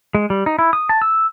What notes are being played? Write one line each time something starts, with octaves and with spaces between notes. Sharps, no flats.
G#3
G3
D#4
E4
D#6
A5
E6